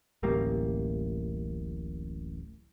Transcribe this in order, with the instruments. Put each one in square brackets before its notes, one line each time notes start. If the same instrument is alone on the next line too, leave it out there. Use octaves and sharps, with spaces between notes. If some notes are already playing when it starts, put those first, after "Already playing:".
[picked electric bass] D1 A1 G3 A#3